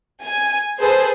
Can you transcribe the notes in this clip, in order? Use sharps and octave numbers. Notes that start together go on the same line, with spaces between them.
G#5
G#4 A4 B4 C5